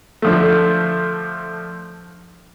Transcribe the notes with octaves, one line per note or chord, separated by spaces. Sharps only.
D3 F3 A3